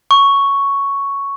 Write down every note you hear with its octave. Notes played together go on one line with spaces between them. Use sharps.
C#6